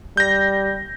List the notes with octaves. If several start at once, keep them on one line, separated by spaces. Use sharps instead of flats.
G3 G6 A#6